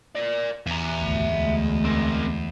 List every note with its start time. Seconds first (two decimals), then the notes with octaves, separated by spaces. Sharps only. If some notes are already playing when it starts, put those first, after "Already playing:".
0.15 A#4 D5
0.67 E2 E5 A#5
1.00 G#1 D2
1.33 D2 G#3
1.85 C4 A#4